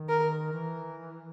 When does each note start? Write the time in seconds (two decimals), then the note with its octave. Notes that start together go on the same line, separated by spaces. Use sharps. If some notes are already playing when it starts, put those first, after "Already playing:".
Already playing: D#3
0.09 A#4
0.52 E3